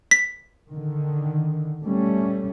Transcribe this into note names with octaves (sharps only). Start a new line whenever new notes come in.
B6
D3 D#3
G3 A3 C#4